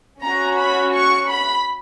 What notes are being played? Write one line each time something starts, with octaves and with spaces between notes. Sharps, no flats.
C#4 F#4 A#5
B5
C#6
B5